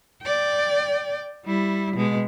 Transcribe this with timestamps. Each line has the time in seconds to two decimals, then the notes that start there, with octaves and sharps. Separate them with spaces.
0.23 D5 G5
1.45 G3 E4
1.96 B2 G#3